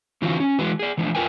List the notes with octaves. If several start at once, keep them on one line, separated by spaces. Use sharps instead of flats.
D3 E3 F3 C4 F4 F#4
C#4
E3 F#3 G#3 F#4 B4
G#4 D5
E3 F3 A3 D4
F2 F4 A#4 B4 G5 G#5